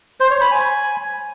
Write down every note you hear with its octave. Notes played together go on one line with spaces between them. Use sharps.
C5
C#5
B5
G#5